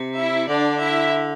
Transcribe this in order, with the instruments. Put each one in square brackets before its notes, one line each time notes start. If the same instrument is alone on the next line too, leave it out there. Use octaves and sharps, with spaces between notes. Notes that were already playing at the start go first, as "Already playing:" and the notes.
Already playing: [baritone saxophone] C3
[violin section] E4 E5
[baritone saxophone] D3 [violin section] D4 D5
[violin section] E4 E5